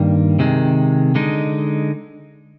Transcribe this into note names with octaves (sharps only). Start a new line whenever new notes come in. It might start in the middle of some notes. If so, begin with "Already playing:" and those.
Already playing: G2 D#3 G3 A#3
C3 D#3 G#3
D3 G#3 D#4